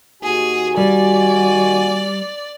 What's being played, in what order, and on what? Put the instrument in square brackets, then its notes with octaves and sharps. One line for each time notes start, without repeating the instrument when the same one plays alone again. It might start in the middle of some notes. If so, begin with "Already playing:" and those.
[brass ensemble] D#2 F#4 G#5 [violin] G#4
[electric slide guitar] G3 [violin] D5